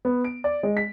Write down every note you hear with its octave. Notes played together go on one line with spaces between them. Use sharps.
B3
D7
D5
G#3
B6